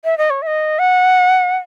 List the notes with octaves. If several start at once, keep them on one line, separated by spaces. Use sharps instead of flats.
E5
D#5
C#5
E5
D#5
F#5